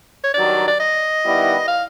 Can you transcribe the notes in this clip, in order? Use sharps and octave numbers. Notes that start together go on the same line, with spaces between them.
C#5
G2 D#3 F#3 D5
D5
D#5
D#3 G3 B3 E4
F5